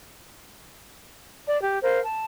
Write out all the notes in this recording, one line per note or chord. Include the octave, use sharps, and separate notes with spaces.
D5
G4
A#4 C5 F5
A5